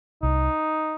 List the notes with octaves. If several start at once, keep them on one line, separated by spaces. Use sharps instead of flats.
C2 D#4